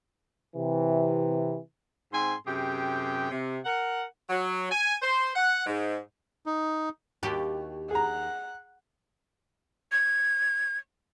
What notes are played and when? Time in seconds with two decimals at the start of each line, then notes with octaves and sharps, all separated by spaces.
0.56 C3 E3
2.13 G#2 C4 G#5 C6
2.46 F#2 C3 G4 G#4 G5
3.30 C3
3.65 A#4 F#5
4.30 F#3
4.71 G#5
5.02 C5
5.35 F#5
5.66 G#2
6.46 D#4
7.23 D#2 F#4 G4
7.91 G#4 F#5 A#5
9.92 G#6